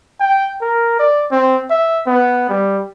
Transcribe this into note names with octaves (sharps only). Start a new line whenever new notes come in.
G5
A#4
D5
C4
E5
B3
G3